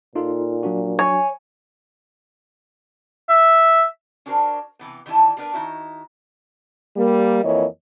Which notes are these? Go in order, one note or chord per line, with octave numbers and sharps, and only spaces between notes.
A#2 D#4 F4 A4
F#3 D4 F#4
C#5 G#5
E5
C#4 D4 F#4 A#4 C5
C3 E3 B3
D#3 E3 G3 G#3 E4 A5
G3 B3 D4 A#4 B4
D#3 D#4 E4 F#4
G3 A#3
F2 E3 A#3 C#5 D#5